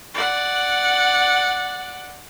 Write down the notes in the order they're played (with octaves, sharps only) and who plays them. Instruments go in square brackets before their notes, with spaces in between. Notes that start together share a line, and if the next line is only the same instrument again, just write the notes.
[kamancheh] D5 F#5